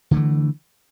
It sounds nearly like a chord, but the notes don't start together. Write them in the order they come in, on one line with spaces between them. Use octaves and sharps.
D3 A3 E3